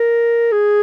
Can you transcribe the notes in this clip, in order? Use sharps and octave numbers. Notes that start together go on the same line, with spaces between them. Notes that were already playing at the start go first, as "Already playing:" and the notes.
Already playing: A#4
G#4